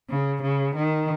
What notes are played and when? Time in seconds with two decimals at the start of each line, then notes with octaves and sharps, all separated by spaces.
0.09 C#3
0.43 C#3
0.76 D#3